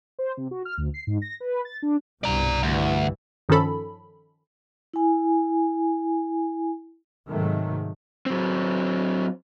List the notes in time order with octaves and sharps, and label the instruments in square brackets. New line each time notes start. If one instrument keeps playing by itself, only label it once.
[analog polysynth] C5
C3
F#4
F6
D2
C7
G#2
A#6
B4
A6
D4
[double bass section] C2 G2 B2 [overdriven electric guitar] D5 A#5
[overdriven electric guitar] D2 [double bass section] G2 E3
[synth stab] G2 D#3 F3 C#4 A4 B5
[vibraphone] E4 G#5
[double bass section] G#2 C3 D#3 F#3 G#3 A3
[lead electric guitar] F#3 C4